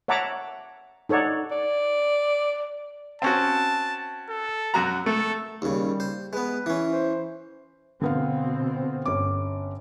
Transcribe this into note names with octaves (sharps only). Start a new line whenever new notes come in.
C#5 E5 F#5 A5 A#5 D6
D#4 A4 C#5 D5 F#5
D5
C4 C#4 F#4 A5
A4
F#2 F#4 A#5
A3 A4
D#2 C#3 G3
C5
G#3 B3 B4
E3 C#4
C5
B2 D3 B3 C4 F5
G1 C#4 D6